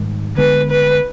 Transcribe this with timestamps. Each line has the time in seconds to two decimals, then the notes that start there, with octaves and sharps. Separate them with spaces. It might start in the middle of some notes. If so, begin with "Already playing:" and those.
Already playing: G#2 D#3 G3
0.38 D3 G#3 B3 B4
0.70 B4